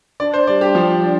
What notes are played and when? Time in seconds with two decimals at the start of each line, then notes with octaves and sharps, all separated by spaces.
0.20 D4 D5
0.34 C5
0.47 G3 D5
0.61 G4
0.75 F3 G3
1.02 G3